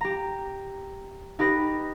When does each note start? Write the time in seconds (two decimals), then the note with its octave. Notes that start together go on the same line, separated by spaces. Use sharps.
0.01 G4 A#5
1.39 D#4 G4 B4 A#6